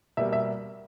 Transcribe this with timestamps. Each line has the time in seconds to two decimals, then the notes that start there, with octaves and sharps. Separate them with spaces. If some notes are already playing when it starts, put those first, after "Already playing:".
0.17 B2 G3 A#3 E5
0.33 E5